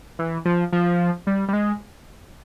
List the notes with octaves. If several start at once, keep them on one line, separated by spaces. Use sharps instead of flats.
E3
F3
F3
G3
G3
G#3